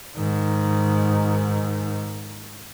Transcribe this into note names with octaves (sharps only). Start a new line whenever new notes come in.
G#2 D#3